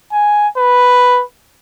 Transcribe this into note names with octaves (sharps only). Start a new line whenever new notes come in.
G#5
B4